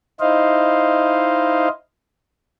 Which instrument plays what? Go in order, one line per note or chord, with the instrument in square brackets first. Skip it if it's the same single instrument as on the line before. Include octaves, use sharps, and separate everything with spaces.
[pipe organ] D#4 E4 C5 D#5 F5